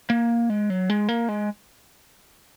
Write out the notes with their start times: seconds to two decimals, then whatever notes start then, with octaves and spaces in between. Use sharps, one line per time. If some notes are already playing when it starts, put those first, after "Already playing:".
0.10 A#3
0.50 G#3
0.70 F#3
0.90 G#3
1.09 A#3
1.29 G#3